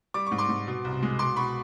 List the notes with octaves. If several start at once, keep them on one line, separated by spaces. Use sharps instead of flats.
G3 D6
G#2 C#6
C6 D6
G#2
B2
C2
G#3
B2 C6 D6
B2 B5 C#6